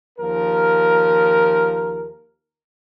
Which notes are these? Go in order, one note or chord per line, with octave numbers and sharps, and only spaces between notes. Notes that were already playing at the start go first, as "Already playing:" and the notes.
D#2 F3 A#4